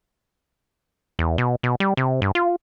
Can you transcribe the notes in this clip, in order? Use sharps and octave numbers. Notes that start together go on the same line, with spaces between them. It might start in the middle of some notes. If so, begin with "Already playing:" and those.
E2
B2
B2
G3
C3
G2
F4